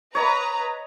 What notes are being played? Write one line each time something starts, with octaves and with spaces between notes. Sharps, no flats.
B4 C#5 D#5 A#5 B5